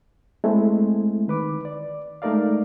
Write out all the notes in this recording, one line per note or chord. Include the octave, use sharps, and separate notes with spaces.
G#3 A3 C4 E4
D#3 B4 D6
D5
G#3 A3 D#4 A#4 D5 F5